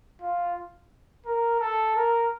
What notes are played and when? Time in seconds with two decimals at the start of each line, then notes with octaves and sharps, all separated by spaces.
0.21 F4
1.26 A#4
1.60 A4
1.96 A#4